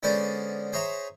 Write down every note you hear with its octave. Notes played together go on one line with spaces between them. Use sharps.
D3 G#3 B3 C#4 C5 D5
G#4 C5 C#5 E5 A#5 C#6